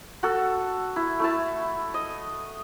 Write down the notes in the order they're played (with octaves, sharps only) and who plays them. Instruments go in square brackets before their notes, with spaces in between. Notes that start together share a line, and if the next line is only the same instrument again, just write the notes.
[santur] F#4 A4
E4
A3 E4 A5
D#5